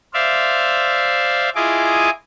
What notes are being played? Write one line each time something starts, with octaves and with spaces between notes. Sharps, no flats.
C5 D5 E5 F5
E4 F4 G#4 D#5 G#5 D6